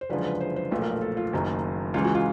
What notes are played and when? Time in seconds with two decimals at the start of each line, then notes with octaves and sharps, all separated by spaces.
0.01 C5
0.10 F#1 F#2 D3 F3 G#3 B4
0.25 B4
0.41 C5
0.56 C5
0.71 B1 A#2 F3 A3 B4
0.82 A#4
0.92 A#4
1.02 A4
1.17 F4
1.33 F#1 F#2 D#3 F#3 A#3
1.94 C#2 C#3 E3 G#3 F4
2.04 F#4
2.15 F4